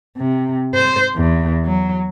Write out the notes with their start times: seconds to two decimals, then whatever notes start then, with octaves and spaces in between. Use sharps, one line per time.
0.17 C3
0.75 C5
1.16 E2
1.65 F#3